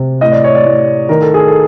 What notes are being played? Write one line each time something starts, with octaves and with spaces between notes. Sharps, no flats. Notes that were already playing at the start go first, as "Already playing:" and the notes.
Already playing: C3
A2 D#5
D5
C#5
D5
A2
D#3 A#4
A4
G#4
A4